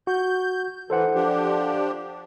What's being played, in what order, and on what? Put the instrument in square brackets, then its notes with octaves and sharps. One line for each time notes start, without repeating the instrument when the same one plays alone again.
[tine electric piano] F#4 [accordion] G6
[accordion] E3 [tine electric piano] A4 C5 F#5
[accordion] F3 D4 G4